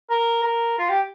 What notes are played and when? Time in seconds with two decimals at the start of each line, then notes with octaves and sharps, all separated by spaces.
0.10 A#4
0.44 A#4
0.79 F4
0.89 G4